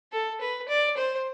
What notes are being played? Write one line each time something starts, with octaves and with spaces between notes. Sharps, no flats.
A4
B4
D5
C5